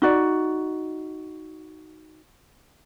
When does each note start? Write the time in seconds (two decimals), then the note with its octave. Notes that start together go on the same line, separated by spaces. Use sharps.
0.02 D#4 F#4 D5